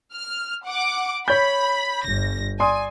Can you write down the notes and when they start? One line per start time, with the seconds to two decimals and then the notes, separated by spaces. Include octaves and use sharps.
0.14 F6
0.65 F#5 D6
1.28 C#5 B5 G6
2.05 G1 A#6
2.60 D5 G#5 C6 D#6